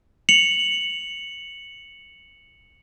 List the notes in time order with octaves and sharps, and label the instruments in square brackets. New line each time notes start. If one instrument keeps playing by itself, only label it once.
[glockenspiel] C#7 F7 F#7